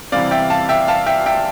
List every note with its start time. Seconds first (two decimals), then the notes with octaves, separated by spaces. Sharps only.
0.12 C3 E3 G3 C4 D5 F5
0.31 E5 G5
0.50 F5 A5
0.69 E5 G5
0.88 F5 A5
1.07 E5 G5
1.26 E5 G5